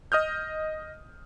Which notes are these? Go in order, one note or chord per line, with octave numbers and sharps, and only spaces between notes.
D#5 D#6 F6 G6